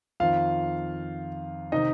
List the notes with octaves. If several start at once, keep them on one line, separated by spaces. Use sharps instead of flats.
F2 D#3 F4 F5
C3 D#3 D#4 D#5